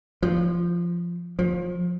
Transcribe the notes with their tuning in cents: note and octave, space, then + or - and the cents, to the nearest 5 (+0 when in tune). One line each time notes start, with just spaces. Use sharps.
F3 -10
F3 +25